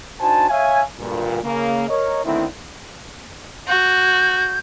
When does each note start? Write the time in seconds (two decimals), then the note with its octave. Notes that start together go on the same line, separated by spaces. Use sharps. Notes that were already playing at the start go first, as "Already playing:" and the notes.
0.20 D4 D#4 F#4 C5 G#5 A5
0.49 C#5 E5 F5 G#5
0.99 D2 G2 A#2
1.43 C#3 A#3
1.88 A#4 C#5 D#5
2.24 D3 D#3 A3 B3 C4 E4
3.68 F#4 G6